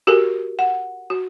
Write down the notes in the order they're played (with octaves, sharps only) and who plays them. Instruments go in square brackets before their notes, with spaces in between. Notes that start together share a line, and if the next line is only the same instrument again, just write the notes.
[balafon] F#4 G4 A4 A#4
F#5
F#4